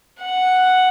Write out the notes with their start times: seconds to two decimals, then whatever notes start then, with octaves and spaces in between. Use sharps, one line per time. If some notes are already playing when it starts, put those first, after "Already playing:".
0.21 F#5